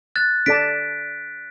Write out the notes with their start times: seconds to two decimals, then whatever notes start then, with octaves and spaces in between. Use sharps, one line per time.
0.16 F#6 A6
0.46 D4 A4 D5 A5 B6 D7